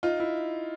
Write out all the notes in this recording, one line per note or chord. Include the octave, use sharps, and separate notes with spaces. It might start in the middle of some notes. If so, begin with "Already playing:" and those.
D#4 F4
E4